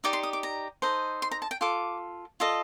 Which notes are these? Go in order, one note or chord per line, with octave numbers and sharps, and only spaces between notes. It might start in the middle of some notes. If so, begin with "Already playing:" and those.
D#4 G4 D5 D6
C6
D#6
D6
A#5
D#4 A4 C5 D#5
C6
A#5
A5
G5
F4 A4 D6
F4 A4 D#5